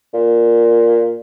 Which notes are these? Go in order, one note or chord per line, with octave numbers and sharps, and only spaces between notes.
A#2